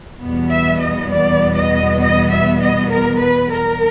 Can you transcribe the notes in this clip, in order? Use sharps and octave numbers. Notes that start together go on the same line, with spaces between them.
E2 B2 G3 B3
E5
D#5
D5
D#5
D#5
E5
D#5
A#4
B4
A#4